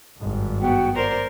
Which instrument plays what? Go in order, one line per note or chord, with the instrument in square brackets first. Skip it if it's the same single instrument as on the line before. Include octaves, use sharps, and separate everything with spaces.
[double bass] G#1 G2
[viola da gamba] B3 [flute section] F#4 F#5 G5
[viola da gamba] A#4 C5 [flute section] D5